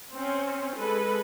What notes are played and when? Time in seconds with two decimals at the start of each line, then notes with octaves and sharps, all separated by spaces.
0.12 C4 C#4
0.76 G#3 A4 B4